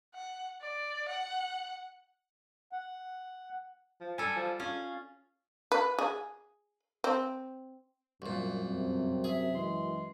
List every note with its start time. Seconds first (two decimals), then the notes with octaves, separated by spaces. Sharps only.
0.14 F#5
0.62 D5
1.09 F#5
2.73 F#5
4.01 F3
4.18 G3 A4 G#5
4.36 F3
4.60 C#4 F4 G#4
5.72 B4
5.99 G#4
7.04 C4
8.22 C2 F#2 A#2
8.64 F2 C3
9.24 G#4 E5
9.55 E3 G#3 C6